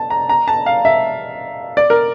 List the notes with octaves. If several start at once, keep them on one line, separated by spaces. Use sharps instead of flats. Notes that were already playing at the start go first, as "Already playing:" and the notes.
Already playing: A5
A#5
A#5
A5
F5
E5
D5
A#4